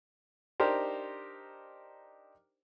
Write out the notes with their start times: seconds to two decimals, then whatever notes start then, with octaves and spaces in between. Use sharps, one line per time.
0.60 D4 D#4 G4 A#4 C5